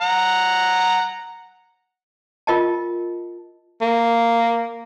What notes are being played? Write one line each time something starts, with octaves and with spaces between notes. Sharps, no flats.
F#5 A#5
F4 A#4 D#5 G5 A5
A#3